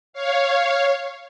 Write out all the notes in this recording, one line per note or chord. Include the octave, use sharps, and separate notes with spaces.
C#5 F5